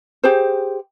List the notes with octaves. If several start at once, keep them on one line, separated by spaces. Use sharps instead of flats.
G4 G#4 C5